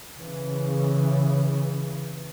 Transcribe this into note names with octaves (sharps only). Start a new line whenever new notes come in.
C#3 E3